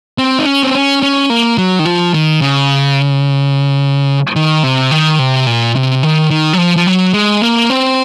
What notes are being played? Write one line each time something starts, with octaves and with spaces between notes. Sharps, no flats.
C4
D#4
C#4
C4
C#4
C#4
A#3
F#3
D#3
F3
D#3
C#3
D#3
C3
D#3
C3
A#2
C3
D#3
D#3
F#3
F3
F3
F#3
G#3
A#3
C4